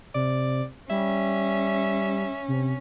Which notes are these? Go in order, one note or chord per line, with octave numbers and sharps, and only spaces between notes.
C3 D5
G3 C#4 E5
C3